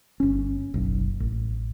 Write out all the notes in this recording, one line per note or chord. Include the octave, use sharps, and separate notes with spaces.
G1 C#4
F#1 B1
A1